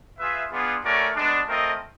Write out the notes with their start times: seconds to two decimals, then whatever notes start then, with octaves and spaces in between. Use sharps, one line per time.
0.19 F4 G#4 B4 E5
0.51 B3 D4 F4 G#4
0.84 A3 C#4 F#4 A#4 D5
1.16 G#3 B3 D4
1.48 A3 C4 F4 A#4 D#5